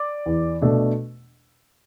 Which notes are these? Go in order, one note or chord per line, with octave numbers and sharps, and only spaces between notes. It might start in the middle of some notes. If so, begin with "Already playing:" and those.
Already playing: D5 D6
E2
B2 A3 D4